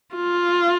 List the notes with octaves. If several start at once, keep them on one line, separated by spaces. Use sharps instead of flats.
F4